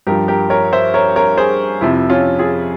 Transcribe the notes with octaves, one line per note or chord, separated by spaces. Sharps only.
G2 F3 G4 A#4
G4 A#4
A#4 C#5
C5 E5
A#4 C#5
A#4 C#5
G#4 C5
F2 C3 F3 E4
C#4 F4
F4 G#4